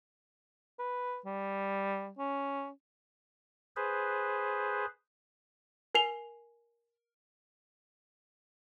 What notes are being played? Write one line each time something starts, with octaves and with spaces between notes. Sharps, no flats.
B4
G3
C#4
G#4 B4 C5
A#4 G#5 C7 F7 G7